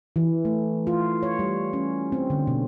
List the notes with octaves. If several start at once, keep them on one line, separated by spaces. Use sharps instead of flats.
E3
A3
F4
C#5
G3
C#4
C4
D3
B2